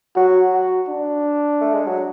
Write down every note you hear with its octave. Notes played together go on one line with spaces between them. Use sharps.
F#3 F#4
F#4
D4
A3
G#3
F#3